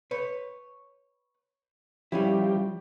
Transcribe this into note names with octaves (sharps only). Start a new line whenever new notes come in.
B4 C#5
F3 G3 C#4 E4 G4